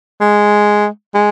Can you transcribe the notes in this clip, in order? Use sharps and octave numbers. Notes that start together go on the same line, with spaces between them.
G#3
G#3